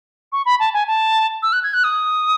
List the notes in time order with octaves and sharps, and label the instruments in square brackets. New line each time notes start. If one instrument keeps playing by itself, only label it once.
[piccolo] C#6
B5
A5
G#5
A5
E6
F#6
G#6
F#6
D#6